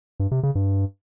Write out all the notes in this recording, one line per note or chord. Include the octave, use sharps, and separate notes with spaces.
G2
C3
C#3
G2